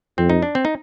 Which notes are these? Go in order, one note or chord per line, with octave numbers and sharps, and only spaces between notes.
F2 C4
D#4
D4
C4
D#4